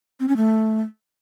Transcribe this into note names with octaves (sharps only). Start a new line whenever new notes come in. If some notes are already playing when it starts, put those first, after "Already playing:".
C4
C#4
A3